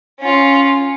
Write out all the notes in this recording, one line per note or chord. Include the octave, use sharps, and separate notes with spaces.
C#4 F4